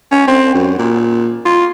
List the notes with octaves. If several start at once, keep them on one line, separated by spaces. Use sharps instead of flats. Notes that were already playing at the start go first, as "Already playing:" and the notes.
C#4
C4
F#2
A#2
F4